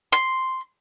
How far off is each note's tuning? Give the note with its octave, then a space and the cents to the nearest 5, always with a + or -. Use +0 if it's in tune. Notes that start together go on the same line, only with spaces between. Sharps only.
C6 +0